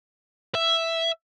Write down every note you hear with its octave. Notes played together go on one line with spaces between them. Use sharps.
E5